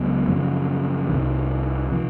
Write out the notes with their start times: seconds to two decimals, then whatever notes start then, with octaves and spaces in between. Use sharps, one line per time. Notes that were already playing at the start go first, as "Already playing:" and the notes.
Already playing: C#2 F#3 B3
0.28 F#2 C#3 F3
1.09 C2 C3 D#3
1.92 C3 F3